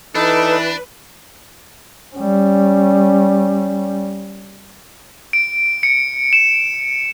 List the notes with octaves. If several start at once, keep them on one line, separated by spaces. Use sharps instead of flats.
E3 D4 D#4 A4 B4
G3 C#4
D7
C#7
E7